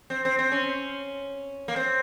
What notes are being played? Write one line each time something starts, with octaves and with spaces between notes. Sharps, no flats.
C4
C4
C4
C#4
A#3
C4